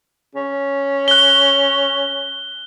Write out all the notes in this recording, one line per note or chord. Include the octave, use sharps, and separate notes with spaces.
C#4
F#6 G7